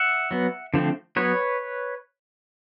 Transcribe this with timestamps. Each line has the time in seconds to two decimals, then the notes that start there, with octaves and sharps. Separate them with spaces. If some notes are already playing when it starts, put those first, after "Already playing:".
Already playing: E5 F#5
0.31 F#3 B3
0.74 D3 F3 A3 C4
1.16 F#3 B3 B4 C#5